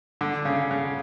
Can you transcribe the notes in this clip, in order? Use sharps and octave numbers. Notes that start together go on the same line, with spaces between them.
D3
C#3
C#3